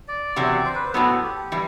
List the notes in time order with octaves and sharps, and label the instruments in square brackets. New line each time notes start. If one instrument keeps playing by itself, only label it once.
[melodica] D5
[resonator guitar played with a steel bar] E2 C3 F#3
[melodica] C5
B4
C5
[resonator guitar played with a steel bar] A2 F#3 B3 [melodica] A4
[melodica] A4
G4
[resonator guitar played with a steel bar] E3 G3